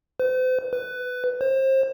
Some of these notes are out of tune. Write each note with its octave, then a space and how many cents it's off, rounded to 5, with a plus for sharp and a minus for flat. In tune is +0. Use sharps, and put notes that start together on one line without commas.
C5 -40
B4 +15
C5 +30